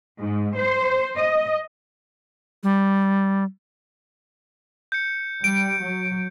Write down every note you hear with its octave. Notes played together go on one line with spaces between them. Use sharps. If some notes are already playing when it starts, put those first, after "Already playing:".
G#2
C5
D#5
G3
G6 C#7
G3 D7
F#3